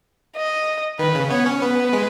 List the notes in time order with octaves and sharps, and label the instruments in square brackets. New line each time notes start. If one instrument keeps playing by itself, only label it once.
[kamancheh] D#5
[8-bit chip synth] D#3 [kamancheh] B4
[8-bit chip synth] C#3
[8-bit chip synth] B3 [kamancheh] C#5
[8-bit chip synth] C#4
[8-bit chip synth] B3 [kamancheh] B4
[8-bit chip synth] G#3